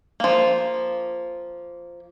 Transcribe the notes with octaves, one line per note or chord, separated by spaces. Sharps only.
F3 A#3